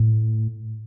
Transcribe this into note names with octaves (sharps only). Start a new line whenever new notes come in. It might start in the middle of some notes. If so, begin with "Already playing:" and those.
Already playing: A2